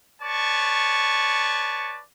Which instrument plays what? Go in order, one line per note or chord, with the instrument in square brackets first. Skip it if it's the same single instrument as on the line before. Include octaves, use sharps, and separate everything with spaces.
[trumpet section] B4 C#5 D5 A5 C#6